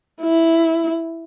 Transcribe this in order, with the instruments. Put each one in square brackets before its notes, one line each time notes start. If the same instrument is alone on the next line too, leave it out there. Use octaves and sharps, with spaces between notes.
[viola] E4